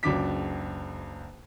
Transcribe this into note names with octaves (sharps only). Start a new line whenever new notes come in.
F#1 C#2 F#3 D4 D6 B6